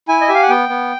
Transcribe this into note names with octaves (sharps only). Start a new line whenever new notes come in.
E4 G#5
D#5
G4 E5
F5
F#5
B3 G5
B3